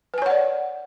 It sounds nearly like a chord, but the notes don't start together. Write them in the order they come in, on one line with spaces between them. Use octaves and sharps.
B4 G#5 C#5 F#5 D5